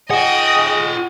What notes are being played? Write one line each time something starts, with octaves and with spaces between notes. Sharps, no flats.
F4 G#4 D#5 F#5 G5